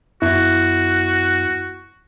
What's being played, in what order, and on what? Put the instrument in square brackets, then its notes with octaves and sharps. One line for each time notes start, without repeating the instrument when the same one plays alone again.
[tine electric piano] F#2 B3 [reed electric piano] E4 [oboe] F#4